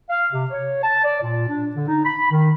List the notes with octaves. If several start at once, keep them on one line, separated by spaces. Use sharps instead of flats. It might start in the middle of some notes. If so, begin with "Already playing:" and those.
F5
C3
C#5
A5
D5
A#2
D4
D3
D#4
B5
D#3